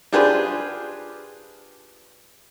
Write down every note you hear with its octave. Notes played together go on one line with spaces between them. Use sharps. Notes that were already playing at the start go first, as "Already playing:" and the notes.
D4 F4 G4 G#4 B4 C5